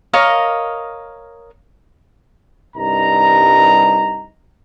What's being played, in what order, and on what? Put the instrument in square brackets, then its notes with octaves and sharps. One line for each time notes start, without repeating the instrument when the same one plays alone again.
[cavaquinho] A#4 C#5 D#5 F5
[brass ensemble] C2 G2 D#4 A#5